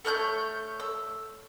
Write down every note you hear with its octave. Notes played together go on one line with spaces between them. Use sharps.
A3 C#5 F#6 G6
E6